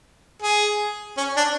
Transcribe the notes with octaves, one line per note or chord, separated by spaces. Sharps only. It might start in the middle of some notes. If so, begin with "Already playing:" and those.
G#4
C#4
D4